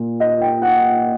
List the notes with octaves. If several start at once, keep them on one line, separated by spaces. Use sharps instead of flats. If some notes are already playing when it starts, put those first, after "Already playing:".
Already playing: A#2
D#5
G5
F#5